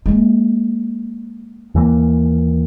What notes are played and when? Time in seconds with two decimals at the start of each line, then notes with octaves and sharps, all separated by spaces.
0.06 G#3 A#3
1.75 D#2 E3 A#3